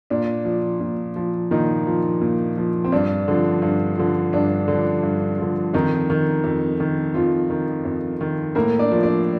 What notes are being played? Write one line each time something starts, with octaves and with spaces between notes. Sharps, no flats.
A#2 D4
F3
A#2
F3
A#2 D#3 D#4
F3
A#2
F3
C4
G2 D4
D3 F3
G2
D3 F3
G2 D4
D3 F3
G2
D3 F3
F2 D#3 D#4
D#3
F2
D#3
F2 F3 F4
D#3
F2
D#3
A2 A#3 A#4
D4 D5
F3
D4 D5